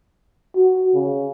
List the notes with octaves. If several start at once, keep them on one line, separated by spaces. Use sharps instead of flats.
F#4
C#3